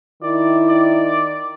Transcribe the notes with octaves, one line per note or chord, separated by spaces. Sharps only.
D#3 E4 D5
D5